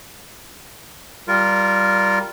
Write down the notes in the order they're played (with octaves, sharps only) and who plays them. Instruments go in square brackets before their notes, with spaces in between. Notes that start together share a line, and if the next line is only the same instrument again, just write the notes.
[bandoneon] G3 F4 A#4